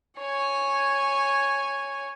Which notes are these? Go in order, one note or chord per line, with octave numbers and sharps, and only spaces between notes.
C#5 G#5